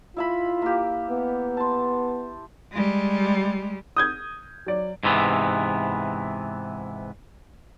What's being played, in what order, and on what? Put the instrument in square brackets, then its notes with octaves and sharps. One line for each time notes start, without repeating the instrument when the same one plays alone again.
[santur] E4 E5 B5 [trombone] F4
[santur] A#3 G4
[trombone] B3
[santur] A5 C6
[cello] G3 G#3
[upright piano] D#6 G6 G#6
F#3 D5
[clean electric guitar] G#2 C3 E3 B3